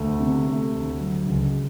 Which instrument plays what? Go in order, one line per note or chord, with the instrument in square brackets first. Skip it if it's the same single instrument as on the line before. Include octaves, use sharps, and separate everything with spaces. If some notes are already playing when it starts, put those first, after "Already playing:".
Already playing: [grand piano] D2 A3
C3
A3
D2
F#3
C#2